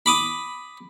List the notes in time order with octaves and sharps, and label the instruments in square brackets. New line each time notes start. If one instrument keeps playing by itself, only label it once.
[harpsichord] B5 D6 D#6